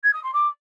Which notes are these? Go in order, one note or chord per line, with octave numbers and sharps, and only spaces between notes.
G#6
D#6
C6
D6